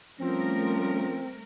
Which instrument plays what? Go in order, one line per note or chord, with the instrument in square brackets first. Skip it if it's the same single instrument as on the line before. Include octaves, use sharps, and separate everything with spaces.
[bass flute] F3 [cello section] G3 A3 A#4 [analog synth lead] C4 [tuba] C#4